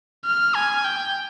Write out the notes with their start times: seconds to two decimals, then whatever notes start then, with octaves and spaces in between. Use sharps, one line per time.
0.25 F6
0.55 G#5
0.85 G5